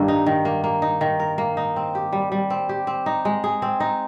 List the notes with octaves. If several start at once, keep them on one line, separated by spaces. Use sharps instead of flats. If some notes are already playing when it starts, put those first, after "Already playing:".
Already playing: G2 D#3 A#3
D#4
D#3
A#3
A#3
D#4
D#3
A#4
A#3
D#4
C4
G4
G3
G3
C4
G4
C4
D#4
G#3
G#4
C4
D#4